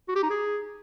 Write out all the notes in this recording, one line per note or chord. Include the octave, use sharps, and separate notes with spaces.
F#4
G4
D#4
G#4